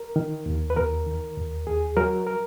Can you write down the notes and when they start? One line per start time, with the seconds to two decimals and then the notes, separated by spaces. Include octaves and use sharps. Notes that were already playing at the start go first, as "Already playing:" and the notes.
Already playing: A#4
0.16 D#3
0.46 D#2
0.70 B4
0.76 D#2 A#4
1.06 D#3
1.37 D#2
1.67 D#2 G#4
1.97 F#3 A#4
2.27 A#4